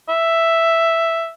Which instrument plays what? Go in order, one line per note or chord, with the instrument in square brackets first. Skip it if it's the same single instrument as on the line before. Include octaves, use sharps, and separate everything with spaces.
[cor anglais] E5